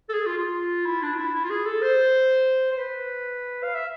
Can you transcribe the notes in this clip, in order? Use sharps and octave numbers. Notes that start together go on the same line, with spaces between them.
A4
G#4
F4
F4
E4
D4
F4
E4
E4
F4
G#4
A4
C5
C5
B4
F5
E5